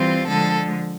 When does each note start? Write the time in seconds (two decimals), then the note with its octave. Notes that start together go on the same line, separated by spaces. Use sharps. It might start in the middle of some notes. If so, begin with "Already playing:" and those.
Already playing: E3 G3 C4 F4
0.27 D3 F3 G#3 A4